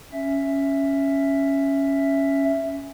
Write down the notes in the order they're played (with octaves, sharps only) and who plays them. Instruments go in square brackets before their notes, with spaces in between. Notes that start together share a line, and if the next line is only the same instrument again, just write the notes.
[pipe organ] C#4 E5